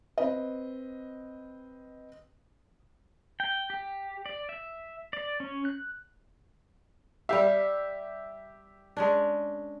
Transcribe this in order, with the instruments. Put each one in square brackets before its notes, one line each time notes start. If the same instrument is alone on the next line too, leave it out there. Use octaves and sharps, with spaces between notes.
[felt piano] C4 B4 D#5
[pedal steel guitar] G5
G4
D5
E5
D5
C#4
F#6
[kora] G3 F5 [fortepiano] G4 E5
[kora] G#3 C#4 D4